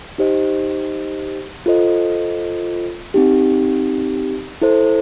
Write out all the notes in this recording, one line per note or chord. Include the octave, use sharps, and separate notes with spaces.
D#4 G4 C5 D#5
F4 A4 C5 D#5
C4 D#4 G4
E4 A4 C5